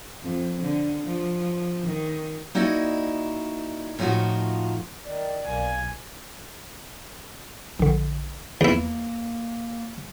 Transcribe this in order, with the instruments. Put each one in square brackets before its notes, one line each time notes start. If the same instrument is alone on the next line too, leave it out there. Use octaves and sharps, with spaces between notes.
[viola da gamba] F2
D3
F3
D#3
[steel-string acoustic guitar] A#3 D#4 E4 F#4 D5 D#5
A2 F3 A3 D#4 F4 F#4
[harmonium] D#3 [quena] D5
[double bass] B1 [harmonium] A#3 [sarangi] G#5
[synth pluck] A#1 D3
[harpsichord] E2 E4 [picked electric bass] A#3